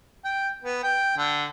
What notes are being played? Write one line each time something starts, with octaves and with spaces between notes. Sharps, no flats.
G5
B3
G5
D3